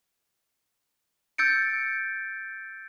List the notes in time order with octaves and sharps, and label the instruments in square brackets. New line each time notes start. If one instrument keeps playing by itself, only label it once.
[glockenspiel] E6 G6 A6 C#7 D7